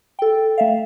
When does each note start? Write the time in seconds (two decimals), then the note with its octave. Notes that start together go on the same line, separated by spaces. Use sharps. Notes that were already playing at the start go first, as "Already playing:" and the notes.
0.19 A4 G5
0.58 A3 E5 F5